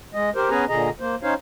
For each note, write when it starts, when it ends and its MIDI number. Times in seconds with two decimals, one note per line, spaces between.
0.14 0.30 56
0.14 0.30 75
0.36 0.50 67
0.36 0.50 70
0.36 0.50 72
0.50 0.65 59
0.50 0.65 61
0.50 0.65 68
0.50 0.65 71
0.50 0.65 80
0.50 0.65 82
0.69 0.90 46
0.69 0.90 50
0.69 0.90 68
0.69 0.90 75
0.69 0.90 82
1.00 1.15 58
1.00 1.15 72
1.23 1.34 61
1.23 1.34 63
1.23 1.34 72
1.23 1.34 73
1.23 1.34 77